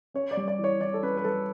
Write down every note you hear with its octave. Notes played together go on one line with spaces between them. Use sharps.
C#4 C#5
D5
G3
D5
E3
C#5
E3 D5
A4
C#4 B4
B4
G3 A4